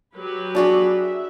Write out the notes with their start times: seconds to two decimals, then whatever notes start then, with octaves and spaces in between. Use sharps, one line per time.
0.15 F#3 G4 B4
0.55 D4 F#4 G#4
0.98 E5